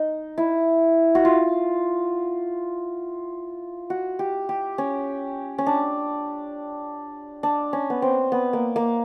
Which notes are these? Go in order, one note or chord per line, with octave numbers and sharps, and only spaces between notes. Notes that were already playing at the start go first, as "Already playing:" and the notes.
Already playing: D#4
E4
F#4
F4
F#4
G4
G4
C#4
C#4
D4
D4
C#4
B3
C4
B3
A#3
A#3